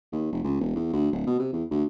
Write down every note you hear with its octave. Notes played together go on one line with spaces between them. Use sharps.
D#2
F1
C#2
E1
E2
D2
D1
B2
C3
E2
D2